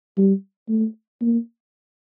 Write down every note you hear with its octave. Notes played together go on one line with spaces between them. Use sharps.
G3
A3
A#3